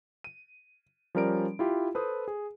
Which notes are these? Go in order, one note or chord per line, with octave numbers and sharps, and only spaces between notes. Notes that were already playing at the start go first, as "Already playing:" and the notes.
D#7
F3 G3 C#4 A#4 D5 D7
E4 F4 G4
A4 B4 C5 D#6
G#4